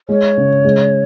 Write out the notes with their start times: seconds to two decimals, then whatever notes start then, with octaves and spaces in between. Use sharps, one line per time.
0.09 G#3 C#5
0.37 C#3
0.64 G#3